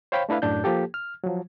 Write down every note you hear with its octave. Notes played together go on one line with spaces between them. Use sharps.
C5 C#5 F5 G5 B5
A3 D4 E4 B4 F5
F#2 A2 D4 G6
F3 A#3 G4 A4
F6
F3 F#3